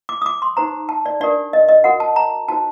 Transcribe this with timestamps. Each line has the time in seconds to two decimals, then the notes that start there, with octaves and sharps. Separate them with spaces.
0.09 D6
0.22 D#6
0.26 D6
0.42 C6
0.57 D#4 G4 C5 A#5
0.89 A5
1.06 D5
1.20 D4 G4 A#4 D5
1.53 D#5
1.69 D#5
1.84 F#4 A#4 F#5
2.00 A5
2.16 A#5
2.48 D#4 F#4 C5 A5